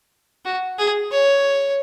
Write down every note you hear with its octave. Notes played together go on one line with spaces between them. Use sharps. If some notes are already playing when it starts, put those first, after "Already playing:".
F#4
G#4
C#5